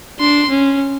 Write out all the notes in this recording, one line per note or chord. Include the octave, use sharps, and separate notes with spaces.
D4 C6
C#4